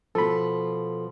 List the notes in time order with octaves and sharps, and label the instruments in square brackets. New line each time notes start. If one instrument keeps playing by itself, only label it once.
[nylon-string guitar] B2 F3 [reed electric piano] A4 B5